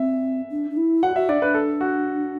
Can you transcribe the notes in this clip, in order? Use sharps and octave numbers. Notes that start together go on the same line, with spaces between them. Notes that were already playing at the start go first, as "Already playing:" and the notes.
Already playing: C4 E5
D4
D4
E4
F#4 F#5
F#4 E5
D4 D5
D4 B4
A4
F#4